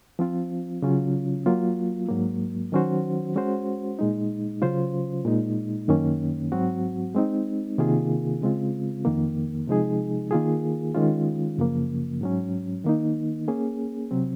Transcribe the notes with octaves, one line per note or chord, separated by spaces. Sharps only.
F3 C4 F4
C#3 F#3 C#4 F4
F#3 A#3 F4
G#2 F#3 A#3
D#3 F#3 C#4 F#4 C5
G#3 C#4 F#4 C5
A#2 G#3 D#4
C#3 F#3 C#4 F4 C5
A#2 G#3 D#4
F#2 D#3 A#3 C#4
G#2 F#3 C4 F#4
G#3 C4 D#4
C3 D#3 A#3 F4 G#4
C#3 G#3 C4 F4
F2 D#3 A#3
C3 F3 G#3 D#4 G#4
D#3 A#3 F4 G#4
D#3 G#3 C#4 F4
F#2 C#3 F3 A#3
G#2 F#3 C#4
D#3 A#3 D#4
A#3 C#4 G#4
C3 F#3 C4